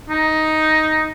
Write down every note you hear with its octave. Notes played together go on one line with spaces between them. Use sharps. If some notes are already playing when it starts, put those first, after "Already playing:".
D#4